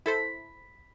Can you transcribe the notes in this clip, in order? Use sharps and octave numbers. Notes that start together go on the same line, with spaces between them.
E4 A4 C5 B5